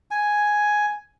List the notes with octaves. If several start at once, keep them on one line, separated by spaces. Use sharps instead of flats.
G#5